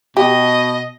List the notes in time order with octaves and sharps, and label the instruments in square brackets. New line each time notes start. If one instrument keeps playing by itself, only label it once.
[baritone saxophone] B2 [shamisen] G4 [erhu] D#5